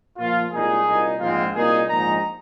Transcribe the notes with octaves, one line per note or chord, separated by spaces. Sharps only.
A#2 F3 A#3 F4
C2 A#2 G#3 D#4 G#4
C2 A#2 A#3 D#4
A#1 G#2 F3 G#3 C4 F4
C2 A#2 A#3 D#4 G#4
A#1 G#2 G#3 D#4 A#5